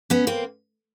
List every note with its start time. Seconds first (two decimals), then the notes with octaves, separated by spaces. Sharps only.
0.10 B3 C#4
0.27 A#3 C4